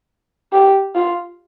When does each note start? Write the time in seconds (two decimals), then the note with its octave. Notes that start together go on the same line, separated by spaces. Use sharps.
0.52 G4
0.95 F4